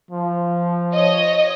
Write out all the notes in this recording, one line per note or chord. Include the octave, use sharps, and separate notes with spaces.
F3
C#5 D#5